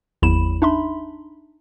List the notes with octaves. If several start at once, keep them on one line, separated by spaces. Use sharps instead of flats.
G#1 E2 F#3 E4 B5 E7
D4 D#4 E5 B5 C6